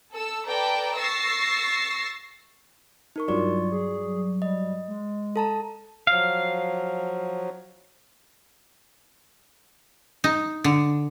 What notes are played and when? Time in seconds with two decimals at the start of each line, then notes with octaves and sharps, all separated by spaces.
0.12 A4 E6
0.47 A4 B4 D5 G5 A5 A#5
0.97 C#6 E6 A6 A#6 C7
3.16 D#4 A#4 C#6
3.28 G2 F#3 F4 D5 C#6
3.72 G#4
4.42 G3 D#5
4.88 G#3
5.36 A4 A5 A#5
6.07 F3 F#3 F5
10.24 D#4
10.64 D3